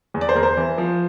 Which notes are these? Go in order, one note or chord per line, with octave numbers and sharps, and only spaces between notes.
E2
D5
C5
E2 A#4
C5
E3
F3